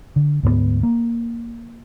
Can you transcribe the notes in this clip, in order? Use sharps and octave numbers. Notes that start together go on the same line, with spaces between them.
D3
D2 G#2 G#3 B3
A#3